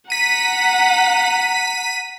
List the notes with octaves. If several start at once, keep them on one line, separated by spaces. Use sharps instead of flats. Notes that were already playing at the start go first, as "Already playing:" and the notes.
F#5 A#5 B6 D#7